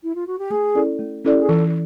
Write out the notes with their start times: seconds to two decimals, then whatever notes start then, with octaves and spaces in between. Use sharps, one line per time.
0.03 E4
0.14 F4
0.26 F#4
0.38 G4
0.50 A3 G#4
0.75 C#4 E4 A4 D5
0.99 A3
1.25 C#4 E4 A4 D5
1.33 G4
1.41 G#4
1.49 E3 A4